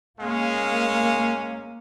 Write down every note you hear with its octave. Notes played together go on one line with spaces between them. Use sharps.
G#3 A#3 C#4 F5